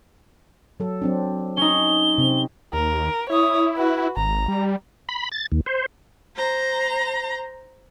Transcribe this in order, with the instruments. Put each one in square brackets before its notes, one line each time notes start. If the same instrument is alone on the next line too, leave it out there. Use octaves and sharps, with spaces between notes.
[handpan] F#3 A4
F#3 C4 D4
[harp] C#4 D#4 [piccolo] G7
[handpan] C3 C4
[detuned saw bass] D#2 [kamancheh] A#4
[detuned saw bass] E4 [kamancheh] C#5 D#6
[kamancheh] F#4 B4
[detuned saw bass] G#1 [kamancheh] A#5
[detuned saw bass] G3
[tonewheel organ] B5
A6
D#2
C5
[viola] C5 A#5